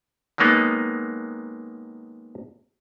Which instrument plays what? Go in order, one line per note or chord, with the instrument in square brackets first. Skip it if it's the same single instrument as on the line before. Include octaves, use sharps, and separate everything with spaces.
[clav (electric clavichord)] D#3 F#3 G#3 A#3 B3 D#4